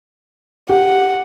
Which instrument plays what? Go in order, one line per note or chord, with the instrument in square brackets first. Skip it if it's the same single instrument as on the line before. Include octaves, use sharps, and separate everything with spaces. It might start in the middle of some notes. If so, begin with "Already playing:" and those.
[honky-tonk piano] G4 [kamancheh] F#5